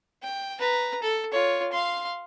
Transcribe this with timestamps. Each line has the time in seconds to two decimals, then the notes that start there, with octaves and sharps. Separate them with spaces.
0.23 G5
0.59 B4 A#5
1.02 A4
1.32 F4 C#5
1.73 F5 C6